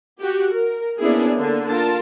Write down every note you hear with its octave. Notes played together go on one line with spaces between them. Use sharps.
F#4 G4
A#4
A#3 B3 C#4 D4 E4 G#4
D3 A#3
F4 A#4 A5